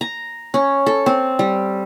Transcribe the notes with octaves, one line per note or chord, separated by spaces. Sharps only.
A#5
C#4
A4
C4
G3